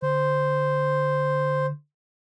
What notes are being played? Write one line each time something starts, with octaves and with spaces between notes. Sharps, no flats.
D3 C5